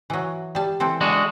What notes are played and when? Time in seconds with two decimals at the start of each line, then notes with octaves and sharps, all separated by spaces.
0.10 E3 F#3
0.55 G3 A5
0.80 E3 C4 A4
1.01 G#3 D4 F#4